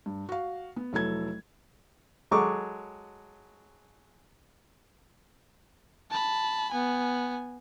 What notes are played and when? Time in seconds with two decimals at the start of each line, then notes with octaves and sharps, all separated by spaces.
0.06 G2
0.29 F#4 F5
0.76 B3
0.93 F1 F#3 E4 A4 G#6
2.31 F#3 G#3 A4 C#6 D6
6.10 A5 B5
6.71 B3 G#5